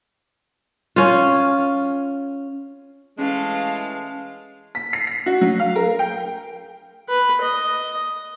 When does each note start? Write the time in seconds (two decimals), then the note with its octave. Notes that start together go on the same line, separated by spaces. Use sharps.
0.96 C#4 F4
3.18 E3 G#3 A3 C#4 F5
4.75 B6
4.93 C7
5.07 C7
5.26 F#4
5.41 F#3
5.59 F5
5.76 A#4
5.99 G5
7.09 B4
7.41 D#5